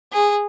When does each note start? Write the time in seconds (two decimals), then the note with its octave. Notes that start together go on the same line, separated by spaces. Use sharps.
0.13 G#4